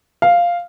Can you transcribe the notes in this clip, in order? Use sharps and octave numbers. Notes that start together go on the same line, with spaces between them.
F5